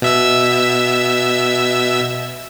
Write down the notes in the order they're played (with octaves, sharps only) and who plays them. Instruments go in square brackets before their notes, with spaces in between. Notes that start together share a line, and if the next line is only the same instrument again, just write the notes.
[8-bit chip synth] B2 E5 E6